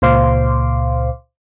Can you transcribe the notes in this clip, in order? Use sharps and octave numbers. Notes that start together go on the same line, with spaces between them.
C#2 A#2 C5 F5 C6 D6